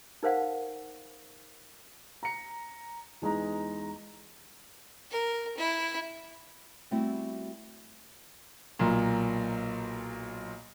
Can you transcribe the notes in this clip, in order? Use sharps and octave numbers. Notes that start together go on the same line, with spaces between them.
D#4 A#4 C5 F5 F#5
A#5 C#7
E2 G#3 D#4 A#5
A#4
E4
G3 A3 B3 C4 E4 F#4
B1 A#2